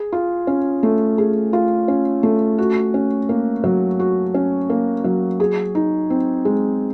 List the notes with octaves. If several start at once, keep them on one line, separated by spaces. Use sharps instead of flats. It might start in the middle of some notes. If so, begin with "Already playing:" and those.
Already playing: G#4
F4
C#4
A3
G#4
F4
C#4
A3
F#4
C#4
A#3
F#3
F#4
C#4
A#3
F#3
G#4
D#4
C4
G#3